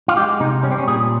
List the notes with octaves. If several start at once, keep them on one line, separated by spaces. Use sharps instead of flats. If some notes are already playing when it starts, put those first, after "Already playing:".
F4
G#3 G4
C3 D#4
G3 C#4
C4
C#4
A#2 G#4